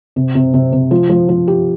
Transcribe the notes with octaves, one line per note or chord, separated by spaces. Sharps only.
C3
C3
C3
C3
F3
F3
F3
G4